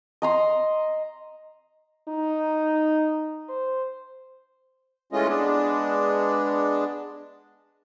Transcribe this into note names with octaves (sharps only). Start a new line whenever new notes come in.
D#5 A#5 C6
D#4
C5
E3 G#3 A3 C#4 F4 D#5
G#3 B3 D4